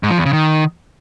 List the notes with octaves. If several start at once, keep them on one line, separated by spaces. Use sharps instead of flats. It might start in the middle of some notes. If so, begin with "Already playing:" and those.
G#2
F3
E2
C#3
D#3